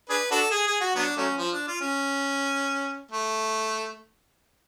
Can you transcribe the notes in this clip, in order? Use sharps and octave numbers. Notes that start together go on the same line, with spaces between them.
D4 G#4 B4
D4 F#4 A4
G#4
G#4
F#4
F#3 B3 D4
F#3 A3 C#4
F3
D4
F4
C#4
A3